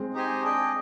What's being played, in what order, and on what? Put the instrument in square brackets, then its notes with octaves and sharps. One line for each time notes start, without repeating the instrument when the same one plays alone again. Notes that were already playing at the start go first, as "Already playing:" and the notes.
Already playing: [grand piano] G#3 C4
[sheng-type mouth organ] D#4 G4 C5 D#5 G#5
D4 G#4 D#5 G5